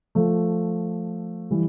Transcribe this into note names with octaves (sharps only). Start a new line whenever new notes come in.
F3 A3
E3 G3